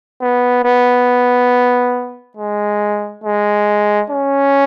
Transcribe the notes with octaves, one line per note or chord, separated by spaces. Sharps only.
B3
B3
G#3
G#3
C#4